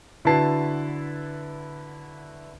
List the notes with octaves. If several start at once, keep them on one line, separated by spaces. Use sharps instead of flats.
D3 E4 F#4 B4 A5 C7